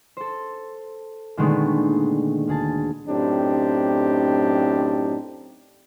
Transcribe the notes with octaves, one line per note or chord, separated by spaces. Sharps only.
A4 C5
A#2 D3 D#3 G#3 A3 B3
D2 G#4 A5
F#2 A2 C4 D4 D#4 G4